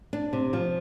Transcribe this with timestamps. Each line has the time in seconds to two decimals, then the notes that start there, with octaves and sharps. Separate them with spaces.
0.13 D4
0.33 C3
0.53 F3